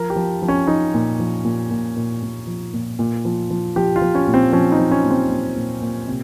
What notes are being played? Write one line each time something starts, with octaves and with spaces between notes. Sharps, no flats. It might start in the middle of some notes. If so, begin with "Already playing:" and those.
Already playing: F3 A#4
G4
F3
F3
C#4
F3 D#4
A#2
F3
A#2
A#2
A#2
A#2
F3
A#2
A#2
F3
F3
F3 G4
F4
F3
C#4
A#2
C4
F3 C#4
D#4
F3
C#4
A#2
C4
A#2
A#2
A#2
C3